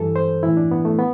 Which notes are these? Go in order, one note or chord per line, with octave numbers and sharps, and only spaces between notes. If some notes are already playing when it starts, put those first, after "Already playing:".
Already playing: G2 E3 A4
C5
A2 E3 E4
D4
B3
A3
B3